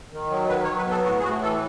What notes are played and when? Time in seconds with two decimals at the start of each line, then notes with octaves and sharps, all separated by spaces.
0.12 D#3
0.30 F#3
0.49 D#3 B4
0.64 C#5
0.68 F#3
0.77 B4
0.87 B3 A4
1.05 A2 F#4
1.19 G#4
1.24 A2 F#4
1.43 E3 A4